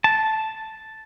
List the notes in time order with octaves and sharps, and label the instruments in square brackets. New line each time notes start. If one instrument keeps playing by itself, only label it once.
[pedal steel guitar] A5